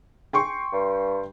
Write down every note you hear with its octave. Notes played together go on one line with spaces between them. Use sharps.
G5 C6 C#6
G2